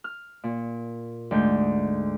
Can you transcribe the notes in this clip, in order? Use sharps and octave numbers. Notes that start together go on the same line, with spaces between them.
F6
A#2
D2 G#2 G6